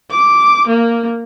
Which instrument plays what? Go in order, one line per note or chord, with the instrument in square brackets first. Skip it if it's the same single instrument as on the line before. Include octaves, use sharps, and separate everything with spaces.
[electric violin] D6
A#3